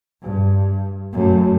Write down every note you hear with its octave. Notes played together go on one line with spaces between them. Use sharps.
G2
F#2 A3